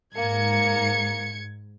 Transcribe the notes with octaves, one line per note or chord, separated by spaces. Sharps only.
G#2 A#3 A#5 G#6 C#7